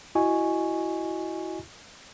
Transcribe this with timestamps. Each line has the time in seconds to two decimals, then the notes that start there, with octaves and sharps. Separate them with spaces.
0.15 E4 F#4 D#5 G#5 C#6